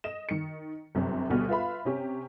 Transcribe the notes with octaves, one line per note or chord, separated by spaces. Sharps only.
D#5 E7
D#3 C#7
G1 F#2 C3 G3
D2 B2 G3 B3 F6
F4 B4 E5 F5 B5
C3 C#4 G4